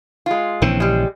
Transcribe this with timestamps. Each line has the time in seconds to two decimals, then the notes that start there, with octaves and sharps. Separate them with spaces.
0.26 G#3 F4
0.62 A#1 C#3 E3 C4
0.80 G3 G#3